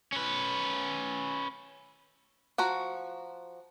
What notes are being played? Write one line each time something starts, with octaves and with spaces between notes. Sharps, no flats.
C#4 B4
F3 F#4 A#5